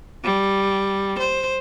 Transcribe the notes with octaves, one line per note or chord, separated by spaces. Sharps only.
G3
C5